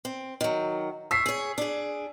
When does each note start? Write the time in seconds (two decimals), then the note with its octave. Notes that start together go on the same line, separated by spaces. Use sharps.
0.05 C4
0.41 D#3 F#3
1.11 C#5 E6 B6 C7
1.26 G#4 C#5
1.58 D4 G#4